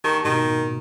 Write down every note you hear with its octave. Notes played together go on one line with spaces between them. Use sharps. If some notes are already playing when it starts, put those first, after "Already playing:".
D#3 G4 A5 C#6
G#2 B2 D#3